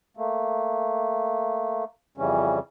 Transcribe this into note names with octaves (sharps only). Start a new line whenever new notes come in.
A3 A#3
F2 C#3 E3 G3 C#4